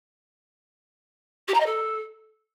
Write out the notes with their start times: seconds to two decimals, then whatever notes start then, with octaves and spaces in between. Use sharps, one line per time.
1.48 G4
1.54 A#5
1.60 D#5
1.66 A4